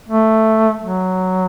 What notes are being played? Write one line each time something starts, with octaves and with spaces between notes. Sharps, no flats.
A3
F#3